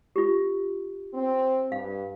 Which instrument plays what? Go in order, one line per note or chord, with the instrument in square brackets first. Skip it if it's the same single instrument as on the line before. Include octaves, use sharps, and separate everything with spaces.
[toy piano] F4 G4
[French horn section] C4
[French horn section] G2 [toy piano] F5